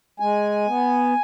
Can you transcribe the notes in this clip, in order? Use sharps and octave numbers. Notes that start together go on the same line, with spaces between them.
G#3 G#5
B3